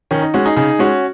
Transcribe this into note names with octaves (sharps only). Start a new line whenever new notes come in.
D#3 C#4
D#4
G#3 C#4 F#4
D#4 G#4
C#3 D#4 G#4
G#3 C#4 F#4